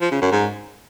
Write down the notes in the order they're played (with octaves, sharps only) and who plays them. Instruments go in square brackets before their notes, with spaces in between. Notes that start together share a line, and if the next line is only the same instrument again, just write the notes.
[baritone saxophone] F3
C#3
F#2
G#2